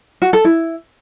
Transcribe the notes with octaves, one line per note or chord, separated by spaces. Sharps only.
F#4
A4
E4